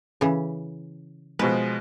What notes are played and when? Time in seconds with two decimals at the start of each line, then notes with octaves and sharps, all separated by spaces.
0.21 C#3 E3
1.39 B2 F3 G#3 B4